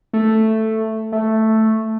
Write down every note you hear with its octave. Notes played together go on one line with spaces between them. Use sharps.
A3
A3